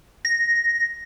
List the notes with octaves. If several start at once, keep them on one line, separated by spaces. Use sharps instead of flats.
A#6